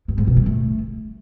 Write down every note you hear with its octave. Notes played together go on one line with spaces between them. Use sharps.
G2
G#2
B2
G3
A3